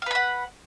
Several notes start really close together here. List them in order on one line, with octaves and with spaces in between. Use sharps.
F5 B4 B5 F#5